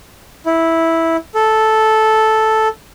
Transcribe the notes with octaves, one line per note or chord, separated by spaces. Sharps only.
E4
A4